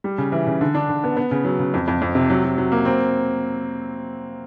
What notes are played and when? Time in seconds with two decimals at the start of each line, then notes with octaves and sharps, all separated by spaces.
0.04 G3
0.18 C#3
0.32 E3
0.47 C#3
0.61 D3
0.75 D4
0.89 D3
1.04 B3
1.17 B3
1.31 C#3
1.45 F#3
1.59 C#3
1.74 F2
1.88 F2
2.02 F2
2.15 C3
2.30 F#3
2.44 F#3
2.58 F#3
2.72 A#3
2.85 C4